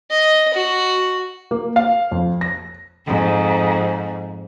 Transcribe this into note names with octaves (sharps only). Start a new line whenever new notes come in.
D#5
F#4
A#3
F5
F2
A#6
F2 G#2